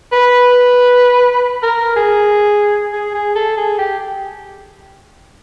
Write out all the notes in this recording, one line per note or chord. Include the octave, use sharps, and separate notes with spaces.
B4
A#4
G#4
G#4
G#4
A4
G#4
G4